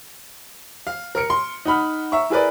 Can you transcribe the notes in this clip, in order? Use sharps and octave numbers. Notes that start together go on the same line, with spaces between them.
F5
A#4 F6 C#7 D7
C6
D#4 F#5 B5 F6
E5 A#5 C#6
E4 G#4 A#4 B4 D5